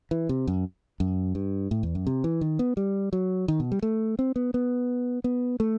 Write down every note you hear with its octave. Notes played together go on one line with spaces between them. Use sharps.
E3
C3
F#2
F#2
G2
A2
E2
F#2
C3
E3
D#3
B3
G3
F#3
D#3
B2
G3
A3
C4
B3
B3
B3
A3